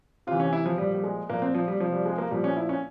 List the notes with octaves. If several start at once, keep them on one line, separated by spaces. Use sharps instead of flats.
C3 E3 F4
C#4
E4
F3
A#2 F3 G3
G3
G#3
A#2 F3 A#3
C4
F3
G3
C3 F3
G3
G#3
A#3
A#2 F3 G3
C#4
E4
C#4